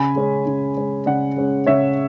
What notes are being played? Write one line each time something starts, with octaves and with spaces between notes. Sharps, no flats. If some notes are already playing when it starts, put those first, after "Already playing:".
Already playing: C#3 G#5 B5
G#3 C#4
C#3
G#3 C#4
C#3 D5 F#5
G#3 C#4
C#3 C#5 E5